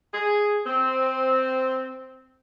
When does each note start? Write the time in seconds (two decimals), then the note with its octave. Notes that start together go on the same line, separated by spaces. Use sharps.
0.13 G#4
0.65 C4